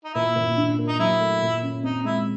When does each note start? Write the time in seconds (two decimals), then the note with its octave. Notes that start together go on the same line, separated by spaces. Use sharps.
0.05 D#4
0.14 A#2 E4
0.36 A#2
0.57 D4
0.79 A#3
0.87 D#4
0.99 F#3 E4
1.20 A3
1.42 A#2
1.63 C#4
1.83 C4 D#4
2.04 G#3 E4